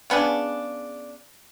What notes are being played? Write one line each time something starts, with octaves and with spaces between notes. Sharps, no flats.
C#3 B3 D4 G#4